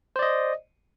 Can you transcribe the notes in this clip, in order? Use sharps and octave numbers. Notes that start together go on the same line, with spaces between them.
C5 D5 D#5